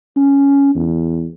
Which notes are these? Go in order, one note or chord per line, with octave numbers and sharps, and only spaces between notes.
C#4
E2